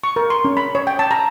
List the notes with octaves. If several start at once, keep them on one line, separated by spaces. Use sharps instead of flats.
C#6
A#4
C6
C#4
B5
C#5
G5
A5
A#5